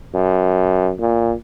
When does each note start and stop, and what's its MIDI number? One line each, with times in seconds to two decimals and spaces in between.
0.15 0.93 42
1.00 1.34 46